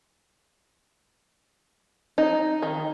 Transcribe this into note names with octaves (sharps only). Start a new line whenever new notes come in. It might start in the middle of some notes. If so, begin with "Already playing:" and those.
D#4
D#3